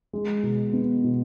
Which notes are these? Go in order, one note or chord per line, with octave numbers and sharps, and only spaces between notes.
G#3
B2
B3
B2